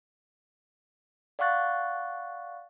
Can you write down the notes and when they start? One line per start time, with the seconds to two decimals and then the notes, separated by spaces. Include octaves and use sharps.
1.39 D5 F5 F#5 C#6 F#6 A6